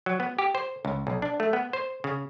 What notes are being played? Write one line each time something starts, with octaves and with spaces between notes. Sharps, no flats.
F#3
B3
G4
C5
C#2
B1
D4
A3
B3
C5
C#3